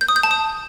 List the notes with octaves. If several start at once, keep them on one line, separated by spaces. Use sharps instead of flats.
G6
D#6
G6
A5
D#6